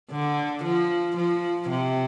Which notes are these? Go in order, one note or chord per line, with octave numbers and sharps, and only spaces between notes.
D3
F3
F3
C3